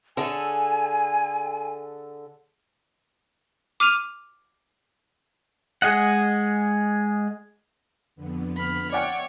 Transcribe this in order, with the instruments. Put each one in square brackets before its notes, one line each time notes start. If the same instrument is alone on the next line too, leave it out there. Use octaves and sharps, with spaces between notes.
[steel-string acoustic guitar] D3 G#4 A4 [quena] G#5
[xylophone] D6 F6 D#7 F7
[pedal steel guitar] G#3 G#4 D#5 F#5
[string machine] F2 D3 B3
[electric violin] B5 F6
[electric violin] C#5 [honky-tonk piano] D5 F#5 G5 [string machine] E5 D6